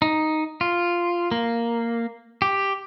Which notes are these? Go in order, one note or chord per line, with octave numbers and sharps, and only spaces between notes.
D#4
F4
A#3
G4